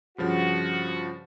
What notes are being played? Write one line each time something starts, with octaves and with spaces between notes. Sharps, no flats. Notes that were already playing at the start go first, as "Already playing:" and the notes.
G2 C#3 F3 F#4